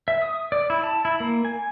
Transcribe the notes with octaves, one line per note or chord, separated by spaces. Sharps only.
E5
D#6
D5
E4
A5
E4
A#3
G#5